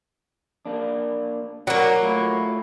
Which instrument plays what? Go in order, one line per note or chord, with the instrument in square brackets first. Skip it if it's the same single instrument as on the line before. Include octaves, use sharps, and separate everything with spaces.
[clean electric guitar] A#3 D4
[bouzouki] F#3 A#3 [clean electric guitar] F#4 A#4 D5
[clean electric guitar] A3 E4 F4